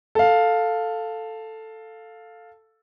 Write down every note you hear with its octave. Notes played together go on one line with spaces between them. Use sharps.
A4 F5